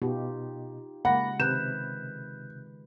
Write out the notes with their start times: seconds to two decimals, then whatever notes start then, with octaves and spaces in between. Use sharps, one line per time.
0.02 B2 D#4 F4 G4
1.05 C#3 G#3 A#3 F#5 B5 A#6
1.40 C3 D#3 B4 F#6 G6 E7